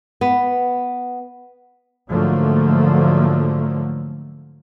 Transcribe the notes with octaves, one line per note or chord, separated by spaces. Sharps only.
B3
G#2 D3 F3 F#3 A3 A#3